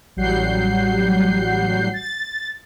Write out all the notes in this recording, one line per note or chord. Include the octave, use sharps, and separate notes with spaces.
A1 F#3 G3 F#5 G6 C7
A6